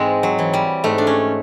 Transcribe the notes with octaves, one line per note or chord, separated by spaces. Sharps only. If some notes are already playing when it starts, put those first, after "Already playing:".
Already playing: G#2 E3 G#3 C4
F#3
E3
G3
G#2 A3
D4
C#4